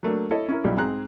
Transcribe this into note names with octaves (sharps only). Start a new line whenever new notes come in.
F#3 A3 A#3 D4
E4 A4 C#5 D#5
C#4 E4 A#4
B1 F#3 G3 E4
G#2 C4 G#4 A#5 F#6